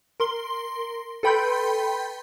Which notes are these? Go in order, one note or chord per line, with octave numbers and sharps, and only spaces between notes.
A#4 C6 G7
A4 B4 G5 B5 C6 G6